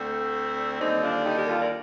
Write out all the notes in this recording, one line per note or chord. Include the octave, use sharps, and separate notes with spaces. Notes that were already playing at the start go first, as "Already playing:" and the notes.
Already playing: D2 D3 A3 C4
D#2 D3 G3 C4 D#4
D4 F4
D#4 G4
G4 A#4
F4 A4
A#4 D5